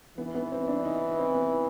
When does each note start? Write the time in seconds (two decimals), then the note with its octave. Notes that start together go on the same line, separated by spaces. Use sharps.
0.18 E3 B3
0.35 B3
0.52 C4
0.68 D4
0.85 D#4
1.19 C4
1.35 B3